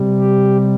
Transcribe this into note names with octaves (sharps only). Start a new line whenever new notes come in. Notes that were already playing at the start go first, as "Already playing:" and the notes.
Already playing: C3 G3
G4